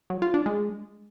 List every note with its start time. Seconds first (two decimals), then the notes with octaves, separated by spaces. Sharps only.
0.10 F#3
0.22 F4
0.34 D4
0.46 G#3